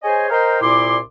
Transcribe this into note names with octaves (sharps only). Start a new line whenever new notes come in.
G#4 C5 C#5 D#5 G#5
A#4 C5 D#5 F5 G5 A#5
C2 A#2 E4 C6 D6